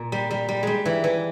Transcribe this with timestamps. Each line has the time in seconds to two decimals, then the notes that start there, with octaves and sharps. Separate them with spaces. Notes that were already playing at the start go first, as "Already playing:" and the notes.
Already playing: A#2
0.12 G3
0.31 G3
0.49 G3
0.63 G3 G#3
0.85 E3
1.04 E3